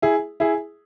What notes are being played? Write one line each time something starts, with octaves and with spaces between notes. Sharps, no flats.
E4 G#4
E4 G#4